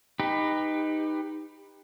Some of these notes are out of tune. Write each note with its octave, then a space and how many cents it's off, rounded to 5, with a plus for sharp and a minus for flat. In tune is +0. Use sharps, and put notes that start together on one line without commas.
D#4 +0 G4 +25 B4 +10